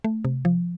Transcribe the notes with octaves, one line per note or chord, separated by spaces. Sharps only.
A3
C3
F3